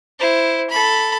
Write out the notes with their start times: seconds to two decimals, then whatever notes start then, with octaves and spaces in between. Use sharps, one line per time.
0.19 E4 C5
0.69 A4 B5